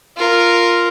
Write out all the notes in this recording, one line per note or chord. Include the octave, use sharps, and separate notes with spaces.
F4 A#4